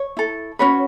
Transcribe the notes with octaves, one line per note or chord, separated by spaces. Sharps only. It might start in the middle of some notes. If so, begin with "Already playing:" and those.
Already playing: C#5
E4 A4
C#4 F#4 B4 C#5